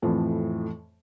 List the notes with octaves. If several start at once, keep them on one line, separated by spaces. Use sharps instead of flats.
F2 A2 E3 F3